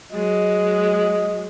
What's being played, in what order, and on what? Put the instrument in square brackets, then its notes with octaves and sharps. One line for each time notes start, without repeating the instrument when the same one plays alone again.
[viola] F#3 G#3 [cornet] D#5